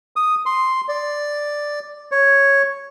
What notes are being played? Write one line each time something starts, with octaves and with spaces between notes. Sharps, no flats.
D#6
C6
D5
C#5